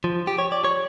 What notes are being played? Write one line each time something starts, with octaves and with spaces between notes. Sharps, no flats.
F3
G4
C#5
D5
C#5